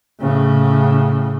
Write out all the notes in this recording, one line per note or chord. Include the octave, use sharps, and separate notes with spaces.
A2 C#3